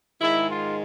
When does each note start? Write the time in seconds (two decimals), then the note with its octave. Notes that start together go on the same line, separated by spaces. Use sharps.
0.21 G#2 D#3 G#3 E4
0.50 F4